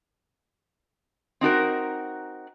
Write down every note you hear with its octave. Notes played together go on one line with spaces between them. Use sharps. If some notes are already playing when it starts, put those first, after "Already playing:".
C4 D#4 F#4 A#4